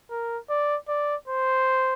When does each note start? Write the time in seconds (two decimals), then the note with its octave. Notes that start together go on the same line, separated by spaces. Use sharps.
0.11 A#4
0.50 D5
0.88 D5
1.28 C5